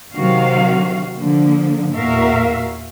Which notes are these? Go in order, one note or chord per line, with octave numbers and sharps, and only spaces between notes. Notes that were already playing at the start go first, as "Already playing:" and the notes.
C3 D#3 F#3 F#4 F5
D3 F3 A#3
E2 A#2 F#4 A#4 E5 F5